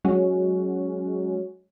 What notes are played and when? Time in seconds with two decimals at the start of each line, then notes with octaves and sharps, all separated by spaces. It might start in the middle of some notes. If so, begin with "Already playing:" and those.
0.04 F#3 G#3 C#4 F#4